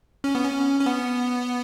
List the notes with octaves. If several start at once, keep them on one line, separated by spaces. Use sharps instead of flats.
C#4
B3
C#4
C#4
B3